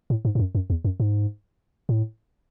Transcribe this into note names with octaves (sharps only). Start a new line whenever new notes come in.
A2
G#2
G#2
F#2
F#2
E2
F#2
G#2
A2